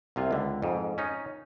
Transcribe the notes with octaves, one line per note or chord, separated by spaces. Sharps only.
C2 C3 F4
C#2 D3
F2 G#2
C#4 D#4